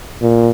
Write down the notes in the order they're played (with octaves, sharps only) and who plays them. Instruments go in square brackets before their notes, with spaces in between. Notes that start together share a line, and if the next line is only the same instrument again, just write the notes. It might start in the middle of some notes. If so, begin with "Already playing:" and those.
[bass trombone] A#2